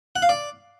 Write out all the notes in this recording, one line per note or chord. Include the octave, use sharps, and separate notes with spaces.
F#5
F5
D5